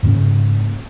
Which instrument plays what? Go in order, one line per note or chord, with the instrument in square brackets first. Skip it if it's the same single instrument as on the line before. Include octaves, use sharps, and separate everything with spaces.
[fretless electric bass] G#2 C#3 A#3 C#4